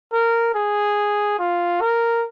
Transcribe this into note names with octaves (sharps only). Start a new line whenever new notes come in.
A#4
G#4
F4
A#4